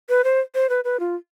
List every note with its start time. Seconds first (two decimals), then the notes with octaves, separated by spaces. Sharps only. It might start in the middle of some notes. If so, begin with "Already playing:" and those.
0.09 B4
0.24 C5
0.55 C5
0.69 B4
0.84 B4
1.00 F4